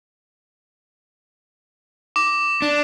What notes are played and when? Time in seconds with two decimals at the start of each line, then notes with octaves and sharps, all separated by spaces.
2.16 D6
2.62 D4